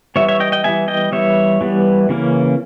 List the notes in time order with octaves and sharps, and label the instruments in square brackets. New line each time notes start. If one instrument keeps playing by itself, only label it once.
[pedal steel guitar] E3 G3 B3 C#5 E5
C#5 E5
D#5 G5
D#5 G5
E3 G3 B3 E5 G#5
D#5 G5
E3 G3 B3 C#5 E5
E3 G3 B3
C#3 E3 A#3 C#4